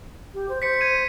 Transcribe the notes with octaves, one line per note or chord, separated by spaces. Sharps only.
G4
C5
C5 B6 C#7
G#6 D#7